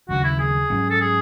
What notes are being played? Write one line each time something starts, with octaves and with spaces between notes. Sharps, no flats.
D#2 C#3 F#3 F#4
E4
G#4
G#2 F#3 C#4
A4
G#4